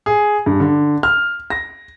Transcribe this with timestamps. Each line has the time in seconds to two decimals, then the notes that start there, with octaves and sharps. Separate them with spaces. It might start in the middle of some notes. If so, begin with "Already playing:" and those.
0.06 G#4
0.46 G2
0.60 D3
1.03 F6
1.50 A#6